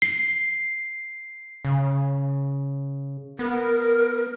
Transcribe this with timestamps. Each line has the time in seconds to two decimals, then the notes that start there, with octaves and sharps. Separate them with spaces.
0.02 C7
1.65 C#3
3.39 B3 A#4